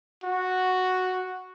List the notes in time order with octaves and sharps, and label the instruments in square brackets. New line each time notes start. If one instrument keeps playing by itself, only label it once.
[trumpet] F#4